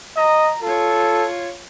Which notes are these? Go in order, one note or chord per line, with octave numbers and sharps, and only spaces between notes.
D#5 A#5
F4 A4 C#5